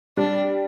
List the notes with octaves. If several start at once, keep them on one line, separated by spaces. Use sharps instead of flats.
G3 D4